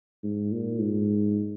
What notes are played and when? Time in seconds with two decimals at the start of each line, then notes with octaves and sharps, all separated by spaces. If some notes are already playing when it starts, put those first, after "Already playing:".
0.23 G#2
0.52 A#2
0.80 G#2